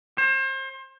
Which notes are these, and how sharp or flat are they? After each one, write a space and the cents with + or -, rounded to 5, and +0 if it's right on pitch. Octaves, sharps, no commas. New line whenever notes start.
C5 +35